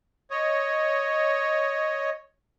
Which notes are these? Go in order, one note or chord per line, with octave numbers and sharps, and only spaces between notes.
C#5 D#5